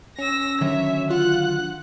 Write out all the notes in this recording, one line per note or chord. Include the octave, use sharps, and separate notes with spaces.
C#4 E6 A#6
D3 D#3 F#3 C#5 E5
F4 F#5 F#6